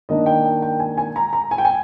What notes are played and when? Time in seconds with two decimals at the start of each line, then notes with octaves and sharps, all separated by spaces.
0.09 D#3 A#3 D4 D#5
0.26 G5
0.45 G5
0.62 G5
0.80 G#5
0.98 G#5
1.16 A#5
1.33 A#5
1.51 G#5
1.58 G5
1.65 G#5